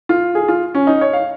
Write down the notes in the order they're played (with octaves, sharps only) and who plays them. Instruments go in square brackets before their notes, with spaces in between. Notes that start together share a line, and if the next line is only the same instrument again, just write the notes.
[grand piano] F4
G#4
F4
C#4
D#4
C#5
F5